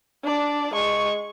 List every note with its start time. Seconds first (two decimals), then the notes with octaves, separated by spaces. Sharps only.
0.24 D4 D5
0.74 G#3 C#6